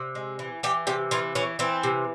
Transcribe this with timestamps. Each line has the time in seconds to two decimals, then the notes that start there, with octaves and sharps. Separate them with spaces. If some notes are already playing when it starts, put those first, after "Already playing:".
Already playing: C3
0.15 G#3
0.39 E3
0.63 E3 G4
0.87 C3 G4
1.11 E3 F4
1.35 E3 C#4
1.59 E3 C4
1.83 C3